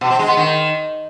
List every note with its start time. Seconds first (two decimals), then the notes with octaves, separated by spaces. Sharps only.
0.01 B2
0.10 C4
0.19 G#3
0.28 B3
0.37 D#3